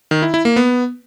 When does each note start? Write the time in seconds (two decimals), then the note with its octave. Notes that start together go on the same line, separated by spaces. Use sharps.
0.11 D#3
0.22 E4
0.34 E4
0.45 A#3
0.56 B3